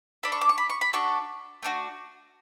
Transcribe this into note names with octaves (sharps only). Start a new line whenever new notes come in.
D4 A4 B5
C#6
D6
C#6
B5
C#6
B5
D4 F#4 A4 C#6
A3 D4 F#4